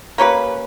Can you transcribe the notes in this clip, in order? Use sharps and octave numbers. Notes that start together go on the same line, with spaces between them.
A#3 C#4 G4 B4